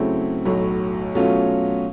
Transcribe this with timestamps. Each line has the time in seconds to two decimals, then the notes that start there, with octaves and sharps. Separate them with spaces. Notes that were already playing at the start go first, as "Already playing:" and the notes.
Already playing: C#3 F#3 A3 C4 E4
0.45 B1 A2 F#3
1.15 B2 F#3 A3 C#4 F4